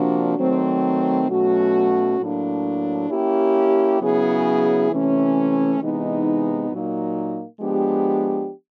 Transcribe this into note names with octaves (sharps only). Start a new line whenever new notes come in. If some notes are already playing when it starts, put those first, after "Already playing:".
Already playing: C3 F3 A#3 D4 F#4
D#3 F#3 A3 C4
B2 F#3 A3 C#4 F#4
A2 F#3 A#3 D4
A#3 C#4 E4 G4
C#3 F#3 B3 E4 G#4
C3 E3 A3 C#4
C3 E3 G#3 B3 D#4
A#2 F#3 A#3 D#4
F3 G#3 B3 D4 G4